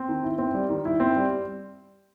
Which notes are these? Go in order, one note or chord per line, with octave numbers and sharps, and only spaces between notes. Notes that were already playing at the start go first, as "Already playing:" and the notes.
Already playing: C4
D#3
E4
C4
G3
D#3
E4
C4
G3